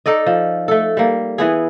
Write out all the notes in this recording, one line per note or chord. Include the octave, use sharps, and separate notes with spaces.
D#4 A4 D5 D#5
F3
A3 A4
G3 A#3
E3 B3 G#4